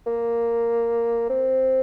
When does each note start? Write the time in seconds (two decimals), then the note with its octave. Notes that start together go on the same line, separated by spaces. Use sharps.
0.07 A#3
1.30 C4